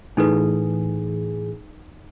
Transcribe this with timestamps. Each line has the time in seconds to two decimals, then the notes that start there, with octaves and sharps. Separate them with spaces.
0.17 A2 E3 D#4 G#4 A4 B4